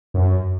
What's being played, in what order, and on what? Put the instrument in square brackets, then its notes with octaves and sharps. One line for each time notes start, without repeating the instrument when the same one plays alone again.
[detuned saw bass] F#2